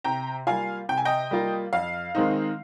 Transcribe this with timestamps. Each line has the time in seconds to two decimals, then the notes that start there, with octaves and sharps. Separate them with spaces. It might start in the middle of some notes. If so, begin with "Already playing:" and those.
0.04 C3 G5 A#5
0.47 G3 A#3 F4 F5 G#5
0.89 C3 G5
0.97 G#5
1.05 D#5 G5
1.31 G3 A#3 F4
1.73 F2 F5
2.15 D#3 G#3 C4 D#4